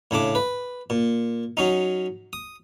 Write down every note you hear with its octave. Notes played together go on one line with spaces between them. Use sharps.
A2 C#3 D4 D6
B4
A#2
F#3 C#4 D#4
D#6